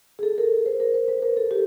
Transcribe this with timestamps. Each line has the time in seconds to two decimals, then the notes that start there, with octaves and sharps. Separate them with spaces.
0.19 G#4
0.23 A4
0.38 A#4
0.52 B4
0.66 C5
0.80 A#4
0.94 C5
1.08 B4
1.22 A#4
1.37 A4
1.51 G4